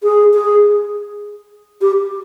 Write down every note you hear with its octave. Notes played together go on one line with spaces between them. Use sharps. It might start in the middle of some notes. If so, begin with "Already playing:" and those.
G#4
G#4
G4